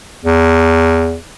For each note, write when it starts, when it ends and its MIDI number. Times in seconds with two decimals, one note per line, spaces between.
0.25 1.17 40